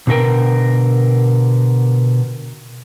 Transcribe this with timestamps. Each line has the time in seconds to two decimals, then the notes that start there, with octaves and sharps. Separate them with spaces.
0.07 B2 D3 A#4 G5